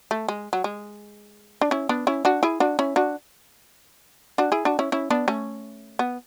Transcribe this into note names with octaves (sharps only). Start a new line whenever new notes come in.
A3
G#3
F#3
G#3
D4
C#4 E4
B3 D4
C#4 E4
D4 F#4
E4 G#4
D4 F#4
C#4 E4
D4 F#4
D4 F#4
E4 G#4
D4 F#4
C#4 E4
C#4 E4
B3 D4
A3 C#4
B3